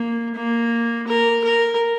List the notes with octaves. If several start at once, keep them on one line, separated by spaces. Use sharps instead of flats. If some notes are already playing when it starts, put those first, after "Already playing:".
Already playing: A#3
A#3
A#4
A#4